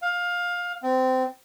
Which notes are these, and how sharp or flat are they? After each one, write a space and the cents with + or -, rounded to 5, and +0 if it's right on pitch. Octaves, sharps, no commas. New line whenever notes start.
F5 +20
C4 -20